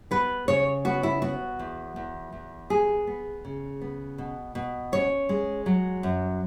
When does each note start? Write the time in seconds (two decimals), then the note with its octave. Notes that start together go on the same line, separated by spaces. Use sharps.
0.11 B3 B4
0.48 C#3 C#5
0.85 B3 F#4
1.03 E4
1.22 B3 F#4
1.59 E2
1.96 E2
2.33 E2
2.70 B3 G#4
3.07 B3
3.45 C#3
3.81 B3
4.18 B2
4.55 B2
4.92 C#4 C#5
5.29 G#3
5.66 F#3
6.03 F#2